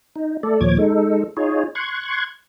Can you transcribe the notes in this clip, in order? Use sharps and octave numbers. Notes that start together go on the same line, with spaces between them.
D#4
A3 A4 D5
D#2 A#2 F3 C#5 D6 G#6
G#3 D#4 A4
D#4 F4 G#4 C#5
C6 C#6 F#6 G#6